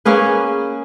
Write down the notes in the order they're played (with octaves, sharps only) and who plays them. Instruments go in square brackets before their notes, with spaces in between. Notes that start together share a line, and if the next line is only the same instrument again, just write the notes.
[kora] A#3 C#4 G#4 B4